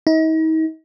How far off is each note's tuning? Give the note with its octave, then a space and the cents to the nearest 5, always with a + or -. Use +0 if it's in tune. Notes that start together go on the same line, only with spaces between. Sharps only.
D#4 +40